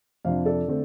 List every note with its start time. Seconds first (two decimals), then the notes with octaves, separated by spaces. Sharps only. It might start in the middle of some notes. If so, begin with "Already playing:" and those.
0.25 F2 C3 F3 D4 C5 F5
0.46 A4 D5
0.68 D3 A3 C4